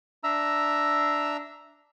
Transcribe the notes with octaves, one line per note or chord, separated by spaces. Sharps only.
D4 E5 A#5 E6